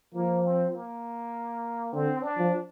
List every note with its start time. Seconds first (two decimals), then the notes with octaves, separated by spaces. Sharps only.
0.14 F3 A#3
0.45 C4
0.74 A#3
1.93 D3 C4
2.23 D4
2.38 F3